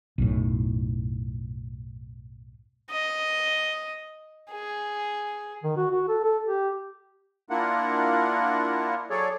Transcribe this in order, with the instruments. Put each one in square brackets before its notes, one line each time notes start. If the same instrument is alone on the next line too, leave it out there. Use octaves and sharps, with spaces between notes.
[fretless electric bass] B1 F#2 A2
[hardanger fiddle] D#5
G#4
[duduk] D#3
F#4
F#4
A4
A4
G4
[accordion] A#3 D4 E4 F4 A#4 F#5
F#3 G#4 A4 C#5 D5